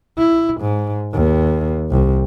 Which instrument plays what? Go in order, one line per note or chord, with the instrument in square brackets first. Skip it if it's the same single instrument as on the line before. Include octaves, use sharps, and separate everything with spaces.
[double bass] E4
G#2
D#2
C2